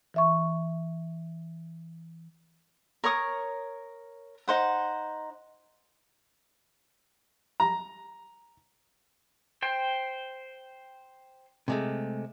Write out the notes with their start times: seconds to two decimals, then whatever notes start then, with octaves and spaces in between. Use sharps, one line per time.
0.14 E3 E5 C#6
3.04 A#4 C#5 C#6 D#6
4.48 D#4 C5 F#5
7.60 A#5
9.62 C5 G5
11.68 C3 G#3 A3